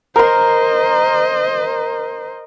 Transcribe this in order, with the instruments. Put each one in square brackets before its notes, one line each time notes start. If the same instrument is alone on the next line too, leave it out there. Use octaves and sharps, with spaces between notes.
[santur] A#4 C6 [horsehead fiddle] C5 D#5